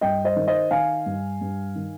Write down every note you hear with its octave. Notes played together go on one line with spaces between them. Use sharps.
G2 D#5 G5
C5 D#5
D#3
C5 D#5
D#3 F5 G#5
G2
G2
D#3